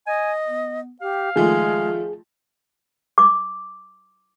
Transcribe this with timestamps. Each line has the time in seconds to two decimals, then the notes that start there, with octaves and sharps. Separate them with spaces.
0.07 D#5 G#5
0.47 B3
1.01 G4 F5
1.36 D#3 F3 G#3 A3 G#4
3.18 D6